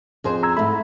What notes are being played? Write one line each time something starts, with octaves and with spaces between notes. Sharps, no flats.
F2 G#4 C5
A#5 E6 G#6
G#2 A3 B5